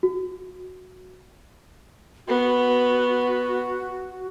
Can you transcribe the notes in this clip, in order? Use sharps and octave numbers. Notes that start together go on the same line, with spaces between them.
F#4
B3 F#4